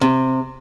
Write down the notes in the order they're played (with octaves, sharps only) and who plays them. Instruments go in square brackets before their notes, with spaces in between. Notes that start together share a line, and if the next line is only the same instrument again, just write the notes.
[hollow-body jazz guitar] C3